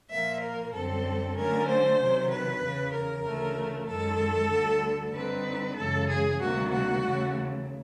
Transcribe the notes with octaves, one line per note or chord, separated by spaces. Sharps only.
A#2 F3 A#3 E5
A#4
F#2 D3 G3 C4 A4
D3 F#3 A3 C#4 A#4
C5
C3 D#3 F#3
B4
E2 C#3 E3
A#4
D2 C#3 E3 A3
F#2 D#3 G#3 A4
D2 D3 G3
D3 G3 C4 D#4 B4
F#2 C#3 E3 G#3 A4
G#4
D2 C3 D#3 G3 A#3 F#4
F#4
D#2 C#3 E3 A3